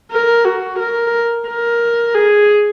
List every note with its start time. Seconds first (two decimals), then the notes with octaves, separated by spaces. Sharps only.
0.12 A#4
0.45 F#4
0.79 A#4
1.48 A#4
2.15 G#4